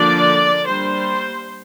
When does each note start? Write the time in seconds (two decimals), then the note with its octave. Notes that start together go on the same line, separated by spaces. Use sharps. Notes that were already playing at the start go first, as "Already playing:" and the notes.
Already playing: D3 F3 A#3 D4 D5
0.67 G3 A#3 D4 C5